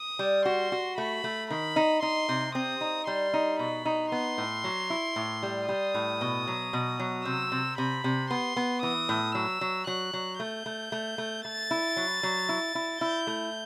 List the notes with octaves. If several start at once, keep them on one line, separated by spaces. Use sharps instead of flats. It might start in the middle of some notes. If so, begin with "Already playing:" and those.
Already playing: D#6
G3
F#4 C6
F#4
A3 B5
A3
D#3 B5
D#4
D#4 C6
C3
C4 D#6
D#4
G3 C6
D#4
B2 B5
D#4
B3 C6
A2
F#3
E4
A2
G3
G3 D#6
A2
B2
F#3
B2
F#3
C3 E6
C3
C3 B5
C3
B3 C6
B3
E3 D#6
A2
F#3 E6
F#3
F#3 F#6
F#3
A3 G6
A3
A3
A3
A3 A6
E4
F#3
F#3
E4
E4
E4 G6
A3